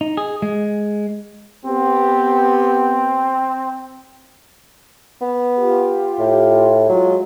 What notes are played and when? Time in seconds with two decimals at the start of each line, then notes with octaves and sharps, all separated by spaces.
0.01 D#4
0.17 G#4
0.42 G#3
1.65 B3 C4 G4
5.21 B3
5.58 F4 G4
6.19 A2
6.89 F#3 G#3 F4